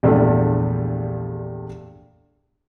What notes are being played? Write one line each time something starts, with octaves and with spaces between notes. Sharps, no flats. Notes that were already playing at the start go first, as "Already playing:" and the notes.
A#1 E2 G2 G3 A3